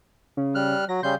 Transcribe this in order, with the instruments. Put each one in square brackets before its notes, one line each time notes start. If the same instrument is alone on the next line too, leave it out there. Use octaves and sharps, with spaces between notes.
[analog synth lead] C#3
[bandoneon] G3 F6 F#6
[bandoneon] F#3 [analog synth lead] A#6
[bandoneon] C#3 G3 G6 [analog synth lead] C6